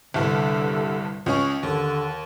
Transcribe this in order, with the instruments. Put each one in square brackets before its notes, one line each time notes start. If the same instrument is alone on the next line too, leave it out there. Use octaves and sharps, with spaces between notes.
[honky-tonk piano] G1 C2 G2 [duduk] D3
[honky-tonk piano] C#2 C#4 C#6
[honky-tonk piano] D#2 [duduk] D3